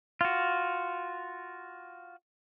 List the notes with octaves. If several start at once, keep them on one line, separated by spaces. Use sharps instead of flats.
F4 F#4